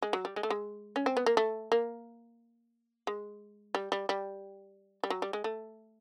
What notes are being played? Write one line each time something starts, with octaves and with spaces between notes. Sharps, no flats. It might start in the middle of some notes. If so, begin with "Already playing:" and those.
G#3
F#3
G3
G#3
A3
G#3
C#4
C4
B3
A#3
A3
A#3
G#3
G3
G3
G3
G3
F#3
G3
G#3
A3